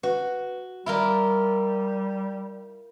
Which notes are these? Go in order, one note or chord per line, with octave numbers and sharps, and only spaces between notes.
F#4 B4
G3 E4 F4 A#4 B5